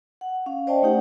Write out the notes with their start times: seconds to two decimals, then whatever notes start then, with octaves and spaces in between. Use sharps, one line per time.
0.21 F#5
0.46 C#4 F5
0.67 C5 D5 D#5 G5 A5
0.82 A3 C#4 D#4 G4 F#5